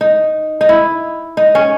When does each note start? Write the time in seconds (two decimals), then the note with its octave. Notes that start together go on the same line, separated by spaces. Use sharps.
0.01 D#4
0.61 D#4
0.69 E4
1.37 D#4
1.55 C#4